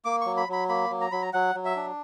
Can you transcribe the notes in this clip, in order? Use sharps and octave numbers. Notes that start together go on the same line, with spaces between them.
A#3 D6
F#3 C#6
B5
F#3 B5
A#3 B5
F#3
A#5
F#3 B5
A#5
F#3 F#5
F#3
E5
D4